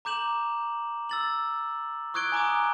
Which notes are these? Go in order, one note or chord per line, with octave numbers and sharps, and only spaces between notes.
A#5 D6 G6 E7 F#7
E6 A6 F#7
C#6 D#6 F#6 G#6 D7 G7
G#5 A#5 D6 D#6